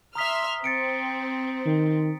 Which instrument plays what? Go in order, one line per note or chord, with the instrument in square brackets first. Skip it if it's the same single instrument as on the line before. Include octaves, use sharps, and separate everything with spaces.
[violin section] E5 C6 F6 [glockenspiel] A#5 D#6 B6
[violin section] C4 [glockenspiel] A6 C#7 D7
[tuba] D#3